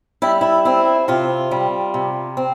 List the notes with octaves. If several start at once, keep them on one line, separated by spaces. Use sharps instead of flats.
G3 E4
E4
C4 E4
C3 F4
G3
C3
C4